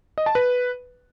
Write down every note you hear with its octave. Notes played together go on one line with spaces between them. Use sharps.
D#5
A5
B4